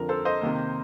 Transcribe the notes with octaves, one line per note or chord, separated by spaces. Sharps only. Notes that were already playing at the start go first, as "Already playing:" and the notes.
Already playing: F2 D3 F3 A#4
A4 C5
C5 D#5
C3 D#3 A#3